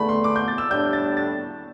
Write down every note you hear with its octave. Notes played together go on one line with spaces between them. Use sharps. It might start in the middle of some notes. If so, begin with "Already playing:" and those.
Already playing: E2 D3 A3 A5 B5
C6
D6
G6
A6
E6
A2 G3 D4 G6
A6
A6